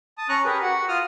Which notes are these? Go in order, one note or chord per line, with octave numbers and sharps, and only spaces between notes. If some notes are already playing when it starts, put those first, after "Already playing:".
A5 D#6
C#4 A#5 C#6 F#6
G4 G#4 A#4 B4
F#4 F#5
F4 D#6 F6